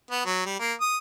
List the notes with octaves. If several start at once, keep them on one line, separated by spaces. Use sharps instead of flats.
B3
F#3
G3
A#3
D#6